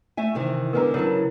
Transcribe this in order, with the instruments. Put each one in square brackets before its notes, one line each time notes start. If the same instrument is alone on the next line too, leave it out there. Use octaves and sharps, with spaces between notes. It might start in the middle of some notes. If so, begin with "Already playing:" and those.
[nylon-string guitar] A3 E5 G#5
C3 D#3 E3
[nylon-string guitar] D3 G#3 B3 [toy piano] A#4 B4 A#5
[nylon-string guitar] C#3 F#3 A5 [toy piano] E4 A#4 C#5
[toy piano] E4